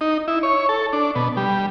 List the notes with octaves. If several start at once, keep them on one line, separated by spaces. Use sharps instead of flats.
D#4
E4
C#5
A4
D4
B2
G3